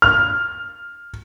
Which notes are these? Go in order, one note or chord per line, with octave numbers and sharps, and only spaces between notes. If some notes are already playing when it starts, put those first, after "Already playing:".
F6